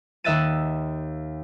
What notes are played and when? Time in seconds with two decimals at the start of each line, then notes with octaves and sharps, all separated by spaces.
0.24 D#2 D#5 E5 F#6 A6 D#7